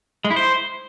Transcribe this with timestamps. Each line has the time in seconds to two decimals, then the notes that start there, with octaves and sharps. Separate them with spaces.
0.25 G#3
0.30 E4
0.36 C5